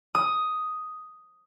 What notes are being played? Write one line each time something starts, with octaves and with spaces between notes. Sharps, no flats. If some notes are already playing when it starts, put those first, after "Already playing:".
D#6